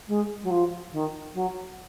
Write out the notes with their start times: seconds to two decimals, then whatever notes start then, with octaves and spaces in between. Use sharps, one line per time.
0.07 G#3
0.42 F#3
0.50 F3
0.92 D#3
1.33 F#3